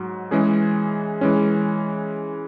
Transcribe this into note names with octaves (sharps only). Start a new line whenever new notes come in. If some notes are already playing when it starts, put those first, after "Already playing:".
Already playing: G#2 F#3 F#4
E3 G#3 C#4 G#4
E3 G#3 C#4